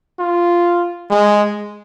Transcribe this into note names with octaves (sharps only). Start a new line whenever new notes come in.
F4
G#3